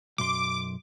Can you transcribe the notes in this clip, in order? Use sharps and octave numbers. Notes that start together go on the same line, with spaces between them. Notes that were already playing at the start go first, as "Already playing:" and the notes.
B1 F#2 C6 D6